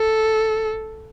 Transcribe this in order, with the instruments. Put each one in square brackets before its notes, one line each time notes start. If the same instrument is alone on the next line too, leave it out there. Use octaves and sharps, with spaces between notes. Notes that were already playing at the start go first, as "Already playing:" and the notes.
Already playing: [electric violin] A4